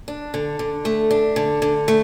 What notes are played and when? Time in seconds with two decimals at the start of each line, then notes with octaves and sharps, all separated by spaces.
0.08 D4
0.34 D3
0.59 D3
0.85 A3
1.11 D4
1.36 D3
1.62 D3
1.88 A3